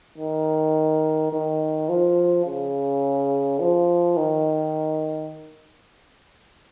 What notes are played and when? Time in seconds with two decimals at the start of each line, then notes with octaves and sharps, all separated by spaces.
0.18 D#3
1.32 D#3
1.89 F3
2.45 C#3
3.60 F3
4.17 D#3